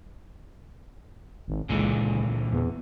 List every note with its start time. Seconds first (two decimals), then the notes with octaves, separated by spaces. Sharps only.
1.48 G#1
1.69 C#2 A#2 D3 E3
2.53 E2